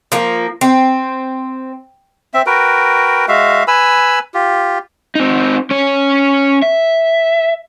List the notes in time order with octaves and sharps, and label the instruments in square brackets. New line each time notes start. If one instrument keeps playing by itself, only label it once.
[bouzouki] F3 A#3
C4
[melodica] C4 E5
F#4 A#4 B4 G5
G#3 F#4 E5 F5
B4 G#5 B5 E6
F4 G4
[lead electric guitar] C4 D#4
C#4 C#5
E5